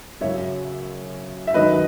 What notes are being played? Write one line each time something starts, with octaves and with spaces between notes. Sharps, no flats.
F#2 C#3 F#3 C#5 E5
E5
F#2 D#3 F#3 B4 D#5